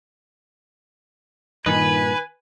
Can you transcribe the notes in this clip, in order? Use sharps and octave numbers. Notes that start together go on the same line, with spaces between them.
G2 A#2 D#3 D#4 B4 G#5